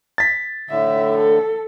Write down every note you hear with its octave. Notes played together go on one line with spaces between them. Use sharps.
A6 B6
A2 D3 E5
A4